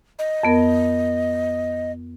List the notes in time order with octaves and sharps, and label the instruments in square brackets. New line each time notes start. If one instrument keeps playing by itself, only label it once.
[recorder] D#5
[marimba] F2 B3 A#4